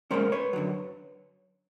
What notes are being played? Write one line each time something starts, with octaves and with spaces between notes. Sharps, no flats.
A#2 F3 G#3 C#4 A#4 C5
B4 C#5
F#2 D3 F#3